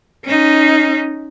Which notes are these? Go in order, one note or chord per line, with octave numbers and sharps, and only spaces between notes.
C#4 D#4